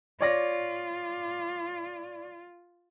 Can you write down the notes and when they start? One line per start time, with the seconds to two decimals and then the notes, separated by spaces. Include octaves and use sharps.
0.21 F4 C#5 D5 A#6